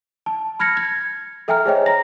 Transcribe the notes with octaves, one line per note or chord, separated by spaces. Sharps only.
A5
B5 F6 G#6 A#6 C#7
G#6
A4 E5 G5 G#5 A#5 F6
G#4 C5 C#5 D#5 G5
A#5 A#6